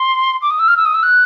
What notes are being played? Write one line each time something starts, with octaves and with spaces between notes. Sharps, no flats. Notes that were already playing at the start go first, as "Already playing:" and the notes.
Already playing: C6
D6
D#6
E6
F6
E6
D#6
E6
F#6